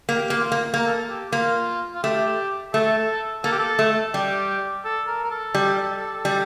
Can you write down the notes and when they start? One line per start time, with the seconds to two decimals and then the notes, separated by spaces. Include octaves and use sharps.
0.09 A#3
0.15 G4
0.30 A#3
0.39 F4
0.52 A#3
0.74 A#3 A#4
0.87 A4
1.10 G4
1.32 A#3 F4
1.94 F4
2.03 A3 G4
2.74 A3 A4
3.44 A#3 A4
3.52 G4
3.59 A4
3.79 A3
4.14 G3 G4
4.85 A4
5.07 A#4
5.24 A#4
5.31 A4
5.55 G3
6.25 G3